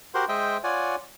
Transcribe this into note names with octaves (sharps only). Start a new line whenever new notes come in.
F#4 G4 A#4 C5 F#5 C6
G#3 C5 D#5 E5 G5
F4 C#5 D5 F#5 G#5